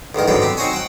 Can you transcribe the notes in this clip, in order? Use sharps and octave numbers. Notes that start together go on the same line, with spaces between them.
A1 E2 D#3 A#4
G#2 B2 D3 F#3 G5
C4 G4
C4 D#4 F#4 C5 C#5 G#5
F#5 G5